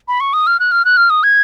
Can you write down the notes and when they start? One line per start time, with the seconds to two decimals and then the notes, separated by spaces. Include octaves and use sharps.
0.08 B5
0.20 C#6
0.33 D#6
0.47 F6
0.60 F#6
0.72 F6
0.85 F#6
0.97 F6
1.10 D#6
1.23 G#6